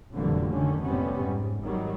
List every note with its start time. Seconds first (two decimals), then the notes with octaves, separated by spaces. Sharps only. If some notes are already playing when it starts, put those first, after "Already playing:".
0.15 F1 A#2 D3 E3 F#3 G3
0.52 D3 D#3 C#4
0.84 F2 A2 C3 G3 B3 C#4
1.21 G#2
1.65 G#1 D#3 F#3 G3